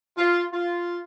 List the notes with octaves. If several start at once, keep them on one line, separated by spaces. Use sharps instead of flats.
F4
F4